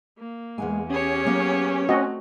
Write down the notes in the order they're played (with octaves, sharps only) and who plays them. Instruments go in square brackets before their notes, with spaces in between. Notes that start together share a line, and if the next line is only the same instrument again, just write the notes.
[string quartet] A#3
[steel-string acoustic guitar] E2 F#5 G#5 [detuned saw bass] G#3
[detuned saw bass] C#4 [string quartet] G4 G#4 C#5
[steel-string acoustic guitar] F#3 A#3 B3
[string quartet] A3 [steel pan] C4 F#4 D#5